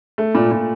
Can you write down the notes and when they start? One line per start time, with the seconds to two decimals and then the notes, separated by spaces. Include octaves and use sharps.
0.18 A3
0.35 A#2
0.51 A#2